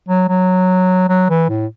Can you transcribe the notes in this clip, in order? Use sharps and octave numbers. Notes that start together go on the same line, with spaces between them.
F#3
F#3
F#3
E3
A2